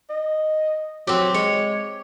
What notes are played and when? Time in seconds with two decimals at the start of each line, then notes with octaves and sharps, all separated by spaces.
0.10 D#5
1.07 F#3 C4 G4
1.34 G#3 C#5